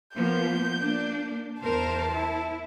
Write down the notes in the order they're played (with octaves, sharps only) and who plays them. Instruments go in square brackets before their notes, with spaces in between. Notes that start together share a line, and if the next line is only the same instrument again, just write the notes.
[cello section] F3 A#3 B3 [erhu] G6
[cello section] A#3 D4
[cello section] E2 A#4 C5 [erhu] A5
[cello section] E4